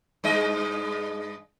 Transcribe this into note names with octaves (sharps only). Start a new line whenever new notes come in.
G2 G#3 D#5